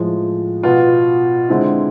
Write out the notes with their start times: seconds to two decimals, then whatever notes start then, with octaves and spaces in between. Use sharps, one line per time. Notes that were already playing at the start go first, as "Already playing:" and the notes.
Already playing: A2 F3 G#3
0.63 B2 B3 F4
1.49 D3 G#3 C4 E4